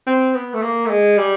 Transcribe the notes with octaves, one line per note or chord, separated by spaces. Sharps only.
C4
B3
A3
A#3
A3
G#3
G3